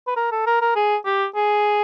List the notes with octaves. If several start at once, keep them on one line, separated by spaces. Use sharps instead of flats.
B4
A#4
A4
A#4
A#4
G#4
G4
G#4